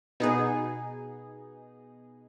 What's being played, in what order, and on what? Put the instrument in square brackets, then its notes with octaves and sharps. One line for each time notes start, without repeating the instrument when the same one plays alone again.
[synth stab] B2 B3 D#4 G#4